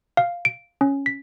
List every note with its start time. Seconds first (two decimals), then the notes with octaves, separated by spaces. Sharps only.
0.17 F5
0.45 D7
0.81 C#4
1.06 B6